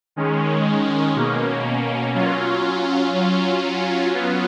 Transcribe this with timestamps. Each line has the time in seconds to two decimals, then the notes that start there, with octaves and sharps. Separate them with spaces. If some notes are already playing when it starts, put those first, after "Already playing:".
0.16 D#3 G#3 C#4
1.15 B2 A#3 C#4
2.15 F#3 C#4 F4
3.13 F#3 C#4 F4
4.12 F#3 B3 F4